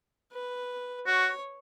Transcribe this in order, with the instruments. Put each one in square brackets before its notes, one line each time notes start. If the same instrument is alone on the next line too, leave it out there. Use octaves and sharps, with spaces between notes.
[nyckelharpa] B4
[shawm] F#4 [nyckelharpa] C#5